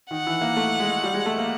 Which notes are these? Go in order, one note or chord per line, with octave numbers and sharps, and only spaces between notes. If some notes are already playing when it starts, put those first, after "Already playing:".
D#3 F#5
E3
A#3
A3
G#3
G3
G#3
A3
A#3